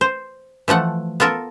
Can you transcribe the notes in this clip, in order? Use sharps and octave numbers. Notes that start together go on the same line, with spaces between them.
C5
E3 F3 A3 F#5
B3 F4 A4 A#4